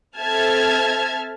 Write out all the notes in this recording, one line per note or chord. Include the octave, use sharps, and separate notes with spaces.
C4 A4 E5 A5 F6 G#6